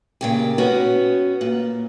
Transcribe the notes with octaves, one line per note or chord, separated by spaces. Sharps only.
A#2 C#3 G4
B3 C#4 F#4
A#2